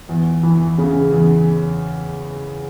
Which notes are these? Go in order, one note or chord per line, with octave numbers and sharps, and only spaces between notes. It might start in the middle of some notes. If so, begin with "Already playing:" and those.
E2
E3
C#3
E2